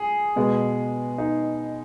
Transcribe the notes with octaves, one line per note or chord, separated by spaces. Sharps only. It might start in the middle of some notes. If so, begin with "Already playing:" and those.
Already playing: G#4
B2 G#3 B3
D#4